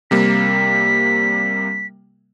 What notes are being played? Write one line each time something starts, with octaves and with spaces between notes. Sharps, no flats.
C3 G3 A#3 B6